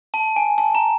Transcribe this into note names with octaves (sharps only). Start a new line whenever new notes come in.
A5
G#5
A5
A#5